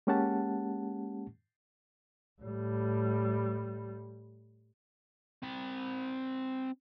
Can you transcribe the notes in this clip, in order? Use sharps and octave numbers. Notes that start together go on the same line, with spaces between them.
G#3 A#3 C#4 G4 F#5 A5
A2 G3
C4 B5